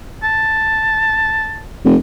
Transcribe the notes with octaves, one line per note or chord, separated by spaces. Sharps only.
A5
F1